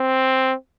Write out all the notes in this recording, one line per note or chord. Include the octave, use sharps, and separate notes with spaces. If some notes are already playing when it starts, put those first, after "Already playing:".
Already playing: C4